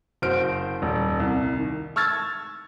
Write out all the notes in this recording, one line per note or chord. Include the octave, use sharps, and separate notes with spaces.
F#1 F#4 C5 F6 D7
D#1
C2
D#3
C#6 E6 F6 G#6 A6